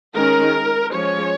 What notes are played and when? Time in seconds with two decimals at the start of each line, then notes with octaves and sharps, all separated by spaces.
0.15 D#3 G#3 C#4 A#4
0.93 F3 G#3 C#4 C#5